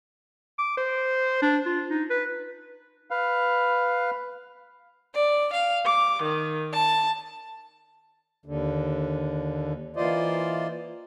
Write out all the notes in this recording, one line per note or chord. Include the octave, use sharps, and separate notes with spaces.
D6
C5
D4
F4
D#4
B4
B4 F5
D5
F5
D6
D#3
A5
D#2 D3
E3 A#3 F4 C5 D5 D#5